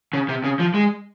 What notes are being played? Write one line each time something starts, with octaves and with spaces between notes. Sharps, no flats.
C#3
C3
C#3
F3
G#3